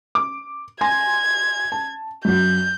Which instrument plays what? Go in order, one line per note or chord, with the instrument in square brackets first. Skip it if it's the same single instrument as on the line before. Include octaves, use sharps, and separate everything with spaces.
[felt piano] D6
[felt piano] G#5 C6 A#6 [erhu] G#6
[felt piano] A5
[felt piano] F#2 F#3 [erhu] G6